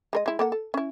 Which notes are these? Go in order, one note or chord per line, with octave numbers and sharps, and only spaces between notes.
G#3 A#4 D#5
G#3 E4
A#3 A4 F#5
A4
C#4 E4